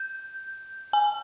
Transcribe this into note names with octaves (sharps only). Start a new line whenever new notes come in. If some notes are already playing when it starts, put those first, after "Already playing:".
Already playing: G6
G#5